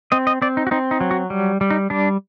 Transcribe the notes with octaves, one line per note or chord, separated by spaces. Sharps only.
C4 D#5
D#5
C4 D5
D#4
F#4
C4 D#4
D#4
F#3
F#4
G3
G3
D#4
G3 D4